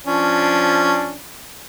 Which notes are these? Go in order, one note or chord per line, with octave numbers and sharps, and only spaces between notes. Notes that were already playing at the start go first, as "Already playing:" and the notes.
F3 C#4 D4